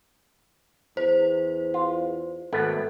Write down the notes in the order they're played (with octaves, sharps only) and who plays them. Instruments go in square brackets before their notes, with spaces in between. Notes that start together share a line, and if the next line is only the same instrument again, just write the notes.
[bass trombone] E2 [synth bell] C5
[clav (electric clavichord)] F4
[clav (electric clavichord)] G#1 A3 B3 [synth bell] A4